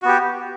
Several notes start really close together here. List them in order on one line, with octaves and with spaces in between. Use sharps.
F#4 B3 G4